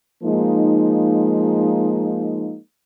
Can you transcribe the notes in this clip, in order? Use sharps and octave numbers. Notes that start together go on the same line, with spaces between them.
F3 G#3 A#3 D#4